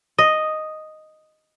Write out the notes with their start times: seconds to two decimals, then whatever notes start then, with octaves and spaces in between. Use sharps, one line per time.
0.18 D#5